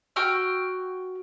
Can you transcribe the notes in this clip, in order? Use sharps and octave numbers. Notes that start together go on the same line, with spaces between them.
F#4 G5 E6 F6